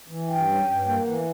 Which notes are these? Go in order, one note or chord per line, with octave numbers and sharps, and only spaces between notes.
E3
G2 G5
C#4
G2
A#3
E3 F#5